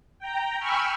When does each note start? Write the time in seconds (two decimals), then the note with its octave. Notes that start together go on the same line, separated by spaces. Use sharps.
0.19 G5 A#5
0.59 G5 G#5 B5 C#6 E6 F6